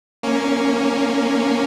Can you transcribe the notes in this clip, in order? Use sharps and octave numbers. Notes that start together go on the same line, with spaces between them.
A#3 C#4